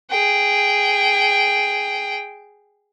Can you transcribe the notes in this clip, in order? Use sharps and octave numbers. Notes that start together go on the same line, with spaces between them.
G#4 G5